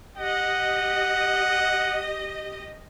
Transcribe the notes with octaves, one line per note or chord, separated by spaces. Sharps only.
G4 D#5 F#5